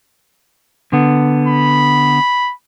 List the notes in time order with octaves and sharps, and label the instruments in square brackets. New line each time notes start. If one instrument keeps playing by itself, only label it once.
[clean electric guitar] D3 B3
[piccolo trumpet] B5